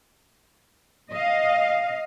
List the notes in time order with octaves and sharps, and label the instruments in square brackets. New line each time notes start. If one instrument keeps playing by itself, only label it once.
[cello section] D#5 F5